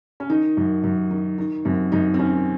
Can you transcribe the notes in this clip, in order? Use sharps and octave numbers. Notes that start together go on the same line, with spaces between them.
C#4
D#3 D#4
F#2
F#2
D#3
D#3
F#2 C4
F#2 D#3 D#4
C4
D#3 C#4